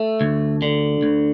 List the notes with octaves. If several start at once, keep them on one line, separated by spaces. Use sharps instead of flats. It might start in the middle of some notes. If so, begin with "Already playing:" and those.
Already playing: A3
D2
D3
D2